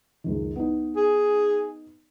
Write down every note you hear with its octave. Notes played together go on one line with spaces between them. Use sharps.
C#2 F#2 D#3
B3 D#4
G#4